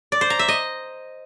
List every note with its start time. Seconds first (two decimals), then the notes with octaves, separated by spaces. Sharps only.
0.12 D5
0.21 C5
0.30 A#5
0.39 E5
0.48 D#5